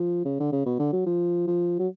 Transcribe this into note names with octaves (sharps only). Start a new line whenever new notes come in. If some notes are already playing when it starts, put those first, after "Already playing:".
Already playing: F3
C#3
D3
C#3
B2
D3
F#3
F3
F3
F#3